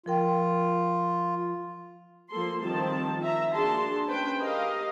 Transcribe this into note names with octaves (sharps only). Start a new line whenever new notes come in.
F3 F4 A#4 G5
F3 A#3 A4 C6
D#3 F3 G3 C4 A5
E5 A#5
A#3 D4 F#4 G#4 A5 C6
C#4 B4 C5 G5
G4 A#4 D#5 F5